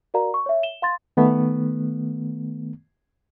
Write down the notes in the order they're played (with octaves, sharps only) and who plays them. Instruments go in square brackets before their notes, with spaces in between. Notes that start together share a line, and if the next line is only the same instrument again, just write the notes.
[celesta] F#4 A#4 D5 F5 A#5
C#6
C#5 E5
E7 G7
F5 C6 A6
[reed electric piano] D#3 A3 B3